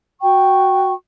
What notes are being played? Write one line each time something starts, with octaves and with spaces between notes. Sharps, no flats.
F#4 G5 C#6